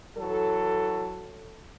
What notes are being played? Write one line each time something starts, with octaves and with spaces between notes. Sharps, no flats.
E3 F#3 A4